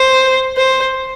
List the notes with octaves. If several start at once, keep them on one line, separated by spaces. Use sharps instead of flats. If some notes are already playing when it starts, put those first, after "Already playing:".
Already playing: C5
C5